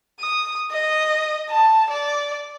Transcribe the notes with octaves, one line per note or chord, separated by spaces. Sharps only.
D#6
D#5
A5
D5